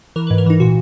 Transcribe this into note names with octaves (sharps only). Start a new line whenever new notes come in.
E3 A#4
G#2 B4
A#4
E3 D#4
A#2 F#4